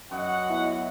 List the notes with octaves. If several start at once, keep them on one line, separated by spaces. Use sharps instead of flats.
F#2 D#4 F#4 F#5
B2 E4